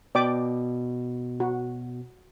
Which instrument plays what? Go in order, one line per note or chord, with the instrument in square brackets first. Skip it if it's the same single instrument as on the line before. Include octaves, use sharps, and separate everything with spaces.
[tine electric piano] B2 [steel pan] D5 G5 D6
[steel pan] F#4